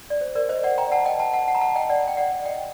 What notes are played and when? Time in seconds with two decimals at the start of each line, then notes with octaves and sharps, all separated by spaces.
0.10 D5
0.21 C5
0.35 A#4 D5
0.49 C5 D#5
0.64 D5 F#5
0.78 G5 A#5
0.92 F#5 A5
1.05 D#5 G5
1.20 F#5 A5
1.33 F#5 A5
1.48 F#5 A5
1.55 A#5
1.61 F#5 A5
1.76 D#5 G5
1.89 D5 F#5
2.08 G5
2.17 D5 F#5
2.45 D#5 G5